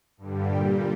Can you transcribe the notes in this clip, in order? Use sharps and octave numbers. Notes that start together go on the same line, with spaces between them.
G2 D3 G3
A#2 G3 G4 G5